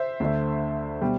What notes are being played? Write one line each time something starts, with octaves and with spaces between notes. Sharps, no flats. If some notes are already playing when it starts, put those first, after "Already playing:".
Already playing: C5 E5
D2 D3 A3
B2 G3